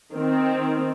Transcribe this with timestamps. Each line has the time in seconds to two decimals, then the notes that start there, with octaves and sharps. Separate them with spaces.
0.14 D#3 C4